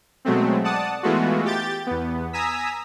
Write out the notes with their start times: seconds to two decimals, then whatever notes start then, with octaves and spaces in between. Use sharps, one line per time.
0.25 B2 F#3 G#3 A3 C4
0.64 D5 F#5 A5 D#6
1.03 E3 G#3 A3 B3 F4 F#4
1.45 G4 G6 A6
1.87 E2 B3
2.33 G#5 A#5 D#6 E6 B6